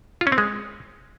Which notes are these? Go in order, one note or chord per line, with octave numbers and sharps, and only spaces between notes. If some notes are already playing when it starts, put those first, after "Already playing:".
F4
C#4
C4
G#3